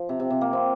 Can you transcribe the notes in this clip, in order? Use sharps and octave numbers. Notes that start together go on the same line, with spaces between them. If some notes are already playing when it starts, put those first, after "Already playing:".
Already playing: F3
C3
C3
C3
A#3
C4